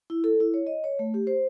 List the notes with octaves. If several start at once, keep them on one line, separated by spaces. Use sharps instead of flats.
E4
A4
E4
C#5
D#5
C#5
A3
G4
C5